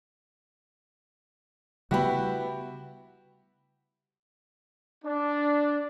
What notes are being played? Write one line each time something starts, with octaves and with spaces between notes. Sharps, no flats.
C#3 G3 A3 B3 E4 F#4 G4 B5
D4